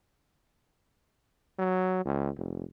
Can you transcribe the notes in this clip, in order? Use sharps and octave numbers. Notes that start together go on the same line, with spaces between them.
F#3
C#2
F1